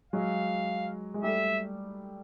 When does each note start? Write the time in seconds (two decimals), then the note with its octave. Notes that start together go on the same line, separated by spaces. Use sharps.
0.13 F#3 G#3 F5
1.14 G#3
1.23 G3 A3 E5